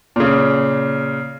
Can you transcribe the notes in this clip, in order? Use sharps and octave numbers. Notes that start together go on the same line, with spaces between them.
A#2 C#3